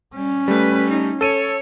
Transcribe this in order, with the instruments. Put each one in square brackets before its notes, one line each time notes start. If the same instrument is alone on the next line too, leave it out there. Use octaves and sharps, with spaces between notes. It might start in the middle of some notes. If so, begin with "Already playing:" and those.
[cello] G3 [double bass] C#4
[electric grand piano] G3 A3 [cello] B4
[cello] D#4
[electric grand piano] A4 D#7 [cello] C#5